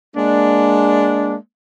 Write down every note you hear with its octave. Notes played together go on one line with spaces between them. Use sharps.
G#3 A#3 D4